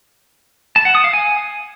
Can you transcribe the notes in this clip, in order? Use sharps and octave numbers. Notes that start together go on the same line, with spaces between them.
A5
F#5
D#6
F5
G#5